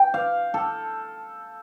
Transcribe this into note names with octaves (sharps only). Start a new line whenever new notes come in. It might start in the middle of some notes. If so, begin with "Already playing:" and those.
Already playing: G5
F5
A4